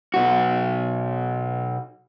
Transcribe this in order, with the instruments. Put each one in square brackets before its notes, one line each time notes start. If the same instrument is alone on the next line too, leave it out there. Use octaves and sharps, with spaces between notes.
[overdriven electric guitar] B1 F#4